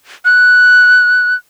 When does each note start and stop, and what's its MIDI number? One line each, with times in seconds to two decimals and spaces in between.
0.25 1.35 90